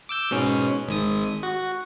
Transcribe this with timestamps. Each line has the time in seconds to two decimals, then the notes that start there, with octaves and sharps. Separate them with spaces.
0.09 D6 E6 G6
0.31 G#2 B2 C#4
0.88 G#1 G#2 D#6
1.43 F#4